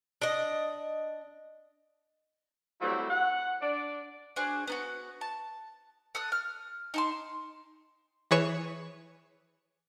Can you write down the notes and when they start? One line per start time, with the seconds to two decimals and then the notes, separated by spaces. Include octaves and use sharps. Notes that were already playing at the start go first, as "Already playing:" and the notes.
0.22 D4 D#5
2.81 F#3 G3 A3 C4 E4
3.09 F#5
3.60 D4 D5
4.36 D4 F#4 G#4 C5
4.67 B3 D4 F#4
5.21 A5
6.15 A4 D#6 F#6
6.32 F6
6.94 D#4 A5 C6
8.31 E3 G#4 B4 C#5 E7